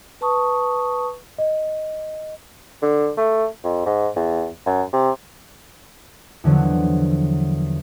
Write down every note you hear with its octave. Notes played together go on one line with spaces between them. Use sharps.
B4 A5 C#6 D#6
D#5
D3
A3
F2
G#2
E2
F#2
C3
E2 D3 F3 F#3